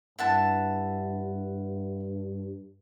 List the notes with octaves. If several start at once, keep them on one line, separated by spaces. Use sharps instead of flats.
G2 E4 F#5 A5